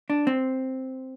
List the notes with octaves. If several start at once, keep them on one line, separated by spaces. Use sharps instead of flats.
D4
C4